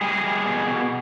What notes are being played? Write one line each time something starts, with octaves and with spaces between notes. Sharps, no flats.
G3 G#4
G3
B2
B2